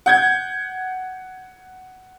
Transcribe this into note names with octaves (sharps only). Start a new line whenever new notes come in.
F#5 G6 G#6